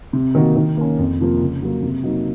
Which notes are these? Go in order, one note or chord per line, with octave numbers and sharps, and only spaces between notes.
C3
D#3 A#3 D#4 F#4
D#3
A#3 C#4
F2
C3 F3 A#3
C#3
F#3 A#3
C3
F#3 A#3 D#4